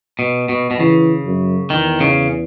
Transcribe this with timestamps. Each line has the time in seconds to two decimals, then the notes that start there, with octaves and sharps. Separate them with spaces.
0.19 B2
0.49 B2
0.71 B2
0.79 C#3 E3
1.25 F#2
1.70 E2 D#3
2.00 C#3